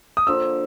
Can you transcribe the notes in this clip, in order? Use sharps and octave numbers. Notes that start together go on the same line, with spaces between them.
D#6
D3 F3 A#3 E6